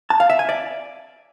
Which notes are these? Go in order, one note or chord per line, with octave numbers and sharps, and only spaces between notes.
A5
F5
E5
G#5
D5